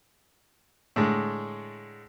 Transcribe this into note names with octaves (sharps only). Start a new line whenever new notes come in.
A2 D3 G#3